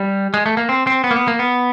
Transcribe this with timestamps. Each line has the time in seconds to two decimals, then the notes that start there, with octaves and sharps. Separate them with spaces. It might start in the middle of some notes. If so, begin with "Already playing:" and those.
Already playing: G3
0.34 G#3
0.46 A3
0.57 A#3
0.69 C4
0.87 C4
1.04 B3
1.11 A#3
1.16 B3
1.28 A#3
1.39 B3